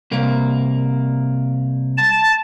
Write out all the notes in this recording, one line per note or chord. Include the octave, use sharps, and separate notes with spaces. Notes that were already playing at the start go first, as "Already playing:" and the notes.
C2 A#3
A5